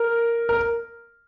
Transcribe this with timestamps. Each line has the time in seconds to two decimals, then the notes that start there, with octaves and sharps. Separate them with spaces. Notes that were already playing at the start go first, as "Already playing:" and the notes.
Already playing: A#4
0.49 A#4